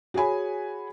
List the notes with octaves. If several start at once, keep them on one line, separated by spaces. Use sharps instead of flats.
F#4 G#4 C#5 G#5 B5